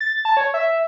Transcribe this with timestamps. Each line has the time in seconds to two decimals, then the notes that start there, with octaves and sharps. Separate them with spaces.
0.01 A6
0.25 A5
0.37 C#5
0.54 E5